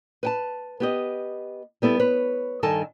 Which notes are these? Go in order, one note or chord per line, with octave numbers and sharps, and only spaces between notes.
B4 G5 A5
B3 G4 D#5
G3 B3 E4 A4
B4 C#5
G2 D#3 A4 D#5 G#5 A5